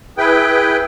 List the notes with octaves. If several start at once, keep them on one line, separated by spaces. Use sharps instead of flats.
E4 G#4 B4 G5